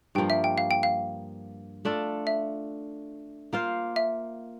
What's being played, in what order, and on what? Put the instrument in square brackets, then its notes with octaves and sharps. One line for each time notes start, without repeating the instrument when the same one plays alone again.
[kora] G2 F3 A#3 [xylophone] G5
[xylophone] E5
G5
F5
G5
F5
[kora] A3 D4 F4 A4
[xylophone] E5
[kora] A#3 F4 C5 F5
[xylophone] E5